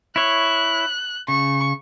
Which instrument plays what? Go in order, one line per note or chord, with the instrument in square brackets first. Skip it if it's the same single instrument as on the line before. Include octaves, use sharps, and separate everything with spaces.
[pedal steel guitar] E4 C#5 [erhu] F#6
[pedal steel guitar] C#3 [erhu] C#6